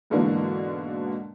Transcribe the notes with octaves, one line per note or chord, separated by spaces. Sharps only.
G#2 B2 D3 E3 A#3 D4